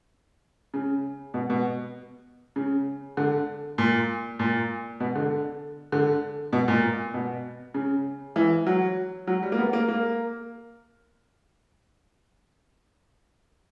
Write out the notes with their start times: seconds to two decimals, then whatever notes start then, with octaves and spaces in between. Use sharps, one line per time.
0.74 C#3
1.34 B2
1.50 B2
2.56 C#3
3.17 D3
3.78 A#2
4.39 A#2
5.00 B2
5.16 D3
5.92 D3
6.53 B2
6.68 A#2
7.14 B2
7.74 C#3
8.36 E3
8.66 F#3
9.27 F#3
9.43 G3
9.52 A#3
9.58 B3
9.73 A#3
9.88 A#3